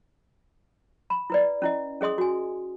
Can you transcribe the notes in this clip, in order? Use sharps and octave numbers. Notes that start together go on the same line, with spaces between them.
B5
E4 B4 D5
C#4 E4 D#5
C#4 G#4 D#5 C6 D#6
F#4 G#5